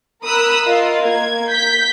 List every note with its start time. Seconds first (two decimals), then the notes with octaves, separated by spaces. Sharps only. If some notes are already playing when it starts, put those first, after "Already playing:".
0.23 A#4 B5 D#6 E6 F#6
0.65 F4 A#4 D#5 F5
1.03 A#3 G#6
1.49 G6 B6